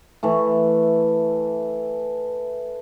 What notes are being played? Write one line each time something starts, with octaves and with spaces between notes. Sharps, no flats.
E3 A3